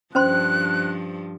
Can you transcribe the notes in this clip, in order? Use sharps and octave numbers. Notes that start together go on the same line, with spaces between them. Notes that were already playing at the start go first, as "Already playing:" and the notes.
G2 F3 C#4 C5 C6 F#6